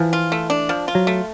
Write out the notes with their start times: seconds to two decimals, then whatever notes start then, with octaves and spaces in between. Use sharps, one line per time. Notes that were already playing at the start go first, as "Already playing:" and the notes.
Already playing: E3 F3
0.13 F4
0.32 A3
0.50 D4
0.69 F3
0.88 F4
0.95 F#3
1.07 A3